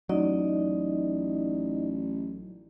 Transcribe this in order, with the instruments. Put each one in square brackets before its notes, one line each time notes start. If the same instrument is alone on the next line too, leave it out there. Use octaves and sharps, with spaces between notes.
[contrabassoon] A1 [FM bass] F#3 [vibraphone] D#4 D5 D#5